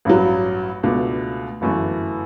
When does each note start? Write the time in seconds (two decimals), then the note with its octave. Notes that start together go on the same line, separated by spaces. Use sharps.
0.05 A1 G2 F#3
0.83 C#2 B2 A3 D4
1.61 G1 F#2 E3 A3